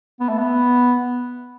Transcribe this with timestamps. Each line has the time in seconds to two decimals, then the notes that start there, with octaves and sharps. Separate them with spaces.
0.20 B3
0.28 A3
0.38 B3